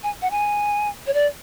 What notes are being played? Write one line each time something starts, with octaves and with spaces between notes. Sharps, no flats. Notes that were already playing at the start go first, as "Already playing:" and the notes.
G#5
F#5
G#5
C#5
D5